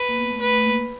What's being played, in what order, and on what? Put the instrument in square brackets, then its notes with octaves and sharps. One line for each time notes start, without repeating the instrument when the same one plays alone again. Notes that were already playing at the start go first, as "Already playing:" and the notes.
Already playing: [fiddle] B4
[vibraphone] A#3
B3
A3
[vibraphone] A3 [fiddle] B4
[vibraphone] A3
A#3